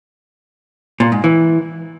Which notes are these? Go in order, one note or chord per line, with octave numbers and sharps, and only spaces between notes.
A#2
G#2
E3